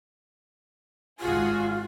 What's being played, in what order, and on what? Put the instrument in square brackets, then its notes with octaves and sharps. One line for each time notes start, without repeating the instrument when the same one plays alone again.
[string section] G#1 F#4 G#4 [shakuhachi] F4